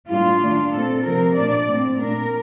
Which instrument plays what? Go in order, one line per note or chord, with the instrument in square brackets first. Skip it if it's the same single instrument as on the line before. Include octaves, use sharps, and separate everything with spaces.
[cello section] A2 G3 A#3 D4 F4
D#3 A3 D4
A#2 A3 C4 A4
C3 F3 C4 A#4
A#2 A3 D4 D5
A2 A3 C4
A#2 A3 D4 A#4